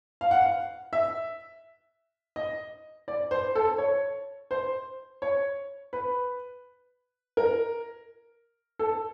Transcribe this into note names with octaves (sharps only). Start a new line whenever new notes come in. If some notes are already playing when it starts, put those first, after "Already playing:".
F5
F#5
F5
E5
D#5
D5
C5
A4
C#5
C5
C#5
B4
A#4
A4